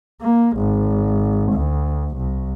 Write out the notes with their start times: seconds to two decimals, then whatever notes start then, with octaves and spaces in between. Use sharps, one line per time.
0.22 A#3
0.58 G#1
1.53 D2
2.17 C2